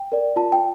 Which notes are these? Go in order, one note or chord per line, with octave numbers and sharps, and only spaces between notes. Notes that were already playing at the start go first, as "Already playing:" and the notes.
Already playing: G5
A#4 D5
F4 A5
G5